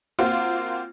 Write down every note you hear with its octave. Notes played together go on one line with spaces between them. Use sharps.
A#3 C4 F4 F#4